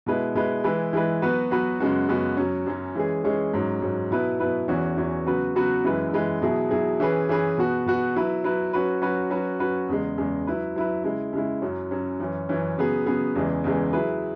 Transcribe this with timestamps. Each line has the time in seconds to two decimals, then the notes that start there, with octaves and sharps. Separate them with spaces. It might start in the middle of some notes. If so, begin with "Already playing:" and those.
0.06 B2 G#3 E4 B4
0.35 B2 G#3 E4 B4
0.64 E3 G#3 E4 B4
0.93 E3 G#3 E4 B4
1.22 F#3 B3 F#4 B4
1.51 F#3 B3 F#4 B4
1.80 F#2 C#3 G#3 B3 F#4
2.08 F#2 C#3 G#3 B3 F#4
2.37 F#2 F#3 C#4
2.66 F#2 F#3 C#4
2.96 E3 G#3 C#4 G#4
3.24 E3 G#3 C#4 G#4
3.54 G#2 F#3 C#4
3.82 G#2 F#3 C#4
4.11 B2 F#3 B3 E4 B4
4.40 B2 F#3 B3 E4 B4
4.68 E2 E3 C#4 F#4
4.97 E2 E3 C#4 F#4
5.26 C#3 F#3 B3 F#4 B4
5.55 C#3 F#3 B3 F#4 B4
5.84 F#2 E3 G#3 E4 B4
6.13 F#2 E3 G#3 E4 B4
6.42 B2 F#3 E4 G#4
6.71 B2 F#3 E4 G#4
7.00 E3 C#4 G#4 B4
7.29 E3 C#4 G#4 B4
7.58 B2 B3 F#4
7.86 B2 B3 F#4
8.16 F#3 E4 B4
8.44 F#3 E4 B4
8.73 F#3 C#4 F#4 B4
9.02 F#3 C#4 F#4 B4
9.30 F#3 C#4 F#4 B4
9.60 F#3 C#4 F#4 B4
9.89 E2 C#3 G#3
10.18 E2 C#3 G#3
10.47 F#3 E4 B4
10.76 F#3 E4 B4
11.04 C#3 G#3 E4
11.33 C#3 G#3 E4
11.62 F#2 F#3 C#4
11.91 F#2 F#3 C#4
12.20 F#2 E3 C#4
12.49 F#2 E3 C#4
12.78 C#3 F#3 B3 G#4
13.06 C#3 F#3 B3 G#4
13.35 E2 C#3 E3 G#3
13.64 E2 C#3 E3 G#3
13.93 F#3 E4 G#4 B4